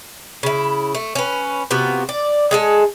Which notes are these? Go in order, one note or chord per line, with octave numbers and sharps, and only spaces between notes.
C#3 E4
A3
C#4 B4
C3 B3 F4 F#4
D5
G#3 G#4 A4